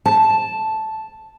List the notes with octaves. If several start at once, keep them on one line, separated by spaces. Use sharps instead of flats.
A5